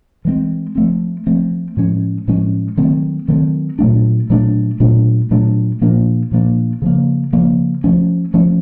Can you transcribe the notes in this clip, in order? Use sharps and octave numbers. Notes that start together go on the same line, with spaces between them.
E3 G#3 C4
F3 A3 C4
F3 A3 C4
A2 F3 G#3 C#4
A2 F3 G#3 C#4
D#3 F#3 A3 C4
D#3 F#3 A3 C4
A#2 F#3 A3 D4
A#2 F#3 A3 D4
A#2 F#3 A3 D4
A#2 F#3 A3 D4
A#2 F3 A#3 D4
A#2 F3 A#3 D4
C#3 F3 A#3
C#3 F3 A#3
F3 A3 C#4
F3 A3 C#4